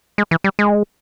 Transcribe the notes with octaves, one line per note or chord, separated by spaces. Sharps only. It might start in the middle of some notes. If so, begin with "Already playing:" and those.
G#3
E3
G3
G#3